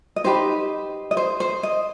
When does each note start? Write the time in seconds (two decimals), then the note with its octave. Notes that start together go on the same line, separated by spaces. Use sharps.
0.16 D#5
0.24 D#4 G4 B4 C5
1.11 D#5
1.17 C5
1.40 C5
1.63 D#5